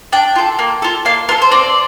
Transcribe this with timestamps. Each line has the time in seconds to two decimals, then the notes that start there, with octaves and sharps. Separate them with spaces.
0.12 D4 G5
0.36 F4 A4
0.59 A#3
0.82 F4 A4
1.05 A#3 F5
1.29 F4 A#4
1.31 A4
1.42 C5
1.51 C4 D5